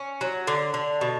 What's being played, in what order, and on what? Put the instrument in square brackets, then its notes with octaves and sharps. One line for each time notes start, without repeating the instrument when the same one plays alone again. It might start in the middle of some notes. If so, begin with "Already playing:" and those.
Already playing: [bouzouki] C#4
F#3
D3
D3
B2